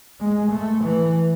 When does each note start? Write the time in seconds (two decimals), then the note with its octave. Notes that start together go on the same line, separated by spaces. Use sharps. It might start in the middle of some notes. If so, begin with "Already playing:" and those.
0.20 G#3
0.52 A3
0.84 E3